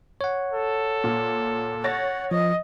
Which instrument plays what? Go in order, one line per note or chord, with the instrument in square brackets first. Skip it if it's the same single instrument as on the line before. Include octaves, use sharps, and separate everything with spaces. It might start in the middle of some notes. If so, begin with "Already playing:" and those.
[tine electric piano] C#5 F#5
[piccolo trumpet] A4
[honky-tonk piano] A#2
[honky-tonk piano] C#5 A6 A#6 [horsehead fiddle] F#5
[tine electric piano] F3 [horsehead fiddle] D#5